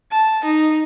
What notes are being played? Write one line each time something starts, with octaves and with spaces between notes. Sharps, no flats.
A5
D#4